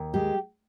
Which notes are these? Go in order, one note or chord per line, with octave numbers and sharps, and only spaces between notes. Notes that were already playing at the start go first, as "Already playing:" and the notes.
Already playing: D#2
G#3 G4